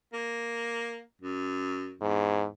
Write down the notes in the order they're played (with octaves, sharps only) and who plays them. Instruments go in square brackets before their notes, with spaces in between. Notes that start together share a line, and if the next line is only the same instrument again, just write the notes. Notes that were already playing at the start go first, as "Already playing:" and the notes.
[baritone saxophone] A#3
F#2
[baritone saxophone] E2 [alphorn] G#2